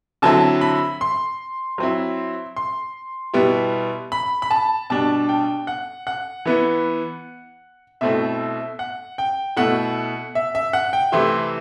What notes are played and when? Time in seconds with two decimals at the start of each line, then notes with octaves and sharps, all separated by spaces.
0.22 D3 F#3 C4 E4 A5
0.61 B5
1.01 C6
1.78 F#3 C4 E4
2.57 C6
3.34 B2 G3 B3 E4
4.12 B5
4.42 B5
4.51 A5
4.90 B2 G3 D4 A5
5.29 G5
5.67 F#5
6.07 F#5
6.46 E3 B3 E4
8.01 B2 A3 C4 E4 E5
8.79 F#5
9.18 G5
9.56 B2 A3 E4 F#5
10.35 E5
10.55 E5
10.73 F#5
10.93 G5
11.12 C3 E3 A3 C4 E4 C6